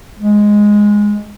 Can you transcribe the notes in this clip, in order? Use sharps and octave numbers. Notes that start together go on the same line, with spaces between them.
G#3